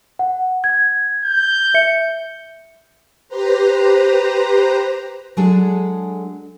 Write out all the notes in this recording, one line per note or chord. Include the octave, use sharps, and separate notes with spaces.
F#5
G#6
G6
E5 C#7
G4 B4 C5 A#5
F#3 G#3 D4 G#4 A4